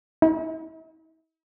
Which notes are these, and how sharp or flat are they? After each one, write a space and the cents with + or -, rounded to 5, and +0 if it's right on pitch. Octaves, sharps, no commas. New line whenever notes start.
E4 -40